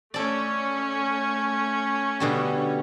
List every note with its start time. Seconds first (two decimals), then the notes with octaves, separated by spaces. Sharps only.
0.14 A3 C#4 A4 D5
2.20 B2 D3 G3